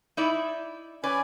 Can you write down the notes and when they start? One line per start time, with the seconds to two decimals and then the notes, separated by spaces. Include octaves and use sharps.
0.17 D#4 E4 D5
1.04 C#4 B4 D5 G#5